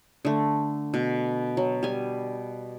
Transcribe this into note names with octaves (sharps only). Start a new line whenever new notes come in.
D3 A3
B2
F#3
G3 G#5